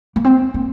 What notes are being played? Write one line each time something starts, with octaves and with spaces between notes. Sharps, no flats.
A#3
C4
A#3